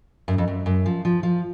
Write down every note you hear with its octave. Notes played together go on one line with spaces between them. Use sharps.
F#2
F2
F#2
F#2
F3
F3
F3